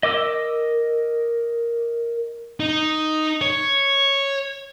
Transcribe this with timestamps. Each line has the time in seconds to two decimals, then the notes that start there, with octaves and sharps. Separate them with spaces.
0.03 A#4 D#5 D6 E6
2.60 D#4
3.42 C#5